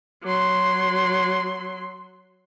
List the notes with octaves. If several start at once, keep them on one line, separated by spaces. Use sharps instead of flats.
F#3 C6